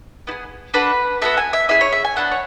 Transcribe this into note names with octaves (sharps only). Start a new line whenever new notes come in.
B3 E4 G#4
D4 F#4 A4 B4
B3 F#4 A4 E5
G#5
E5
C#4 E4 G#4 E5
C#5
E5
G#5
B3 D4 A4 F#5
C#5